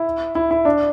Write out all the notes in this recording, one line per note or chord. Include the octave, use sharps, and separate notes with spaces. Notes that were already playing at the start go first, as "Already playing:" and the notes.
Already playing: E4
E4
E4
D4